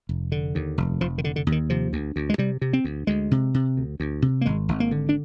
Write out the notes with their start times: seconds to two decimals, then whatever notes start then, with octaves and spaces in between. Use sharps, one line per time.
0.09 F1
0.32 D3
0.55 D#2
0.78 F1
1.01 F1 F3
1.18 D#3
1.24 D3
1.36 D3
1.47 D#2
1.52 D#3
1.70 C3 F3
1.93 D2
2.16 D2
2.30 G#3
2.38 C3 G3
2.61 C3
2.73 C4
2.84 D2
3.07 D2 G#3
3.31 C3
3.54 C3
3.77 D2
4.00 D2
4.22 C3
4.41 A#3
4.46 G#1 G#3
4.68 G#1
4.80 A#3
4.91 D3
5.09 D4